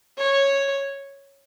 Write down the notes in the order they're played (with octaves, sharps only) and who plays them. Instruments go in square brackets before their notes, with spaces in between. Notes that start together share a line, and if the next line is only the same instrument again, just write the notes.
[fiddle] C#5